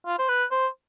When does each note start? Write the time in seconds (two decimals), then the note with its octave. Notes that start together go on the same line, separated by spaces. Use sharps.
0.06 F4
0.19 C5
0.29 B4
0.51 C5